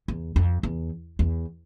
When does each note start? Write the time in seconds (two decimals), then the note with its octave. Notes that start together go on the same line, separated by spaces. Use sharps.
0.08 E2
0.36 F2
0.63 E2
1.19 E2